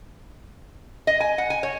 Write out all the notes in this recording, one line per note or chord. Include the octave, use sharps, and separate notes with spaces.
D#5
G#5
F#5
G#5
C#5